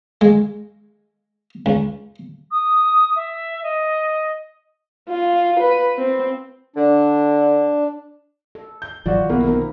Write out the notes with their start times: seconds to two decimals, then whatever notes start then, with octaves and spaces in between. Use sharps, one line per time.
0.21 G#3
1.66 C#2
2.51 D#6
3.16 E5
3.63 D#5
5.10 F4
5.60 B4
5.98 C4
6.76 D3 D4
8.55 A4
8.82 G6
9.06 G#1 E3 F#3 F4 F#4 D5
9.30 B1 E3 A#3 B3 E4 F#4
9.44 D#3 A#3 C4 A#4